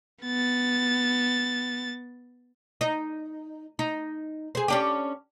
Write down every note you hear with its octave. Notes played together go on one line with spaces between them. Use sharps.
B3 A6
D#4
D#4
G#4 C5
C#4 D4 G4